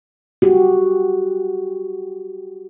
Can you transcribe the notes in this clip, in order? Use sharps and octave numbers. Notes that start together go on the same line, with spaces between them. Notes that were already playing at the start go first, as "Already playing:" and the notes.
F#4 G4